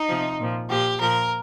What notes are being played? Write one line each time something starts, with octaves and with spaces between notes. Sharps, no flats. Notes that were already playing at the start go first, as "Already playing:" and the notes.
Already playing: D#4
C3 F3
A#2 F3
A#2 F3 G4
A#2 F3 A#4